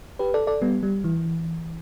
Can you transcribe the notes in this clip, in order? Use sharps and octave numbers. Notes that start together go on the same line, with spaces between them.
G4 B4
A4 D5
A4 D5
G3 B3
G3
E3